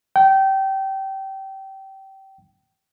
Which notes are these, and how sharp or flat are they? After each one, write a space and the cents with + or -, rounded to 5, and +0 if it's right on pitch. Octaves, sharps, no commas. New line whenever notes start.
G5 -25